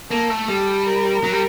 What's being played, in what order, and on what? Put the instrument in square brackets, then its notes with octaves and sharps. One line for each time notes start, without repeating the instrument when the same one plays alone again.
[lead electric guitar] A#3 [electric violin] A4
[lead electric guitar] A3
[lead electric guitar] G3 [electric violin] A4
[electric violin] A#4
[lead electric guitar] F#3
G3